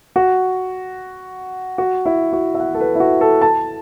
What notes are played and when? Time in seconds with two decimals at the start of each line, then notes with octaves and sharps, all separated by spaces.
0.16 F#4
1.78 F#4
2.05 E4
2.33 F#4
2.55 E5
2.60 F#5
2.74 A4
2.80 B4
2.95 E4
3.00 F#4
3.21 A4
3.41 A5